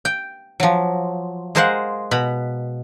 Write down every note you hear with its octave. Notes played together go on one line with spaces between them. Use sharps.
G5
F3 F#3
G#3 G#4 A#4 C5 F5 F#5
B2 A#5 B5